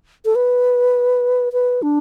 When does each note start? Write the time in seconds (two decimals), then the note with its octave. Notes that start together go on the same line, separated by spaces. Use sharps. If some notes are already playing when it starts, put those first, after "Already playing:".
0.25 A4
0.35 B4
1.53 B4
1.82 D4